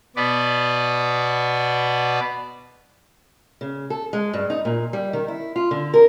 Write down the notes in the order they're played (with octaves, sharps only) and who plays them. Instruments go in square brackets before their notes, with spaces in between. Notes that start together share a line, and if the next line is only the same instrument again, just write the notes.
[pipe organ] B2 B3 B4 D5
[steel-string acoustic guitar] C#3
A4
G#3
G2
D#4
A#2
G3
D#3
E4
F4
D3
A#4